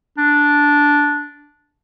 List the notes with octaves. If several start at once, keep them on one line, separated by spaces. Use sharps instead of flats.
D4